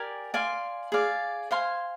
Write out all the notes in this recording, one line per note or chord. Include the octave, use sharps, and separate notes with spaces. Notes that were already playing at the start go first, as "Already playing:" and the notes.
Already playing: G4 A#4 D5 G#5
D5 F5 G#5 C6
G#4 D5 F5
C5 F5 G#5 C6